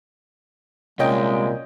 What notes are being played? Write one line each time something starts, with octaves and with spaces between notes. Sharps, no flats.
C2 A#2 G#3 C#4 D#5 G5